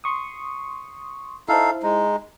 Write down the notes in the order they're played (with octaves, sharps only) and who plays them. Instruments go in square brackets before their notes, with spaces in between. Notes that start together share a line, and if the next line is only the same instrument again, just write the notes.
[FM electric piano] C6 C#6 D#6
[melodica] D#4 A4 F5 [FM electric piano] E4 C5
[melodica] G#3 D#4